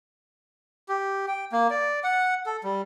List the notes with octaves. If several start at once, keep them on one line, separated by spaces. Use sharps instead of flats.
G4
G5
A#3
D5
F#5
A4
G3